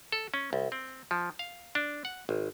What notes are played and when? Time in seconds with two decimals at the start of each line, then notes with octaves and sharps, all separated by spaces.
0.12 A4
0.34 C#4
0.53 C2
0.72 C4
1.11 F3
1.39 F5
1.75 D4
2.05 F#5
2.29 G#1